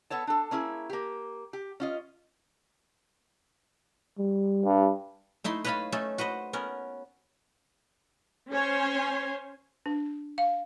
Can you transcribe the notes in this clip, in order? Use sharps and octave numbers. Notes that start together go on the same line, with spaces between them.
B3 A4 C#5 A5
D4 A4
A#3 C#4 E4 G#4
A#3 G4
G4
C#4 F4 D#5
G3
G2
A3 D#4 E4 C6
B4 C#5 D#5 F5 A5 B5
A3 C#4 D#4 A4
F#4 B4 C5 D#5
B3 C#4 A#4
C#4 C5 C#5 G#5 C6
D4
F5